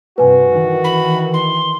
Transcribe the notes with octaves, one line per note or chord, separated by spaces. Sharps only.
G2 C3 F#4 B4 G#5
D#3 E3
B5
C6